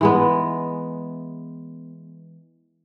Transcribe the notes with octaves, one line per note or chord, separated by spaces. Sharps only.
E3 G#3 B3